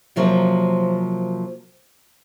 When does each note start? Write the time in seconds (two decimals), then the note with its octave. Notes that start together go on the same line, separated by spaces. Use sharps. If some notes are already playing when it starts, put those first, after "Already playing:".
0.16 C3 F3 F#3 A#3